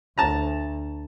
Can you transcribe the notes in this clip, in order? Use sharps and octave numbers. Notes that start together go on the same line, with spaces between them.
D2 A5 A#5